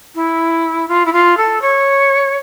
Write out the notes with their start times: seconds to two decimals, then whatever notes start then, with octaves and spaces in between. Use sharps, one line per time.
0.15 E4
0.88 F4
1.05 E4
1.12 F4
1.37 A4
1.61 C#5